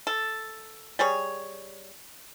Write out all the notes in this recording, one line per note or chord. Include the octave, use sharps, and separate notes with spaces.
A4
G3 G#4 C#5